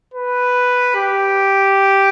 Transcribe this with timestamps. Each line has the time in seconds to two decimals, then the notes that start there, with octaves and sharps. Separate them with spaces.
0.14 B4
0.96 G4